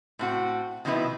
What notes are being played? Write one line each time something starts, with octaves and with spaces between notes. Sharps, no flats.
A2 C4 F#4
B2 D#3 F3 D#4 E4 B4